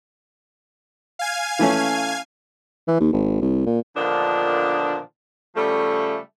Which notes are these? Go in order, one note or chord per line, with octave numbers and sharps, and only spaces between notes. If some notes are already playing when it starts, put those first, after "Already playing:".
F5 G#5 G#6
E3 A3 C#4
E3
D#2
G#1
C2
A#2
A#2 D3 D#3 F3 B3 D4
C#3 F3 G3 A3